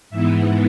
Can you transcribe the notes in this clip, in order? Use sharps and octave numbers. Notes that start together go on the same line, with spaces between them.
G#2 E3 B3 E5